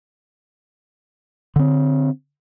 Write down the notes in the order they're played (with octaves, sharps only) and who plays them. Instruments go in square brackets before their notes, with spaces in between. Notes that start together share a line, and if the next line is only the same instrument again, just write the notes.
[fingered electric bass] D3 C4